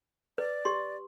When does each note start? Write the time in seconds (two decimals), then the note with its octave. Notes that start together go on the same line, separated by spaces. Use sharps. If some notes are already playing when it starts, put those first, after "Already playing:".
0.38 B4 D5
0.65 G4 C6